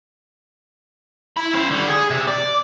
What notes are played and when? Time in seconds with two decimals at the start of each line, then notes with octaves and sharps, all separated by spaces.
1.37 E4 B5
1.54 C#4 C5
1.71 D3 G3
1.89 G#4
2.10 C3
2.28 D5